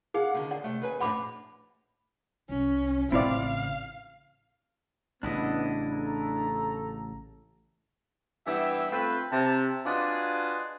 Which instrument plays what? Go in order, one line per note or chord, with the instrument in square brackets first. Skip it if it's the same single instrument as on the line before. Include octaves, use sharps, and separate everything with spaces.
[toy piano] D#4 G#4 [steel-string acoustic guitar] F5 F#5
[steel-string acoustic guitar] D#2 D3 D#3
[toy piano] D5 F#5
[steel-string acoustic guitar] C3 A3
D#2 B4 G#5
[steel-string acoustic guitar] F2 A2 D4 [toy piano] F#5 B5 D6
[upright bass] C2 [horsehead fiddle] C#4
[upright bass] A1 C#3 [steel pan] C4 E4 D5 [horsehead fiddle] F5
[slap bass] A1 C#3 [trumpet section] B3 [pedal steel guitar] D4 E4 D#5
[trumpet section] A3 A4 A#5
[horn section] G2 E3 B3 G4 E5
A3 C4 F4 B4
C3 A5
D4 F4 F#4 G#4 B4 D#5